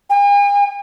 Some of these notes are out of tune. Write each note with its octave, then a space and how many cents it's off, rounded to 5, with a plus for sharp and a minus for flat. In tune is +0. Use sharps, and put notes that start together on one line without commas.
G#5 -45